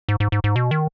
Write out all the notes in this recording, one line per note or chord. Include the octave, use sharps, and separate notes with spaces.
G#2
G#2
G#2
G#2
B2
D#3